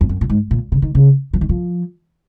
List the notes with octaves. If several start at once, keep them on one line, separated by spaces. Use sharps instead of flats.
F2
F#2
A#2
G#2
A#2
C#3
D#3
C#3
F3
D#3
F3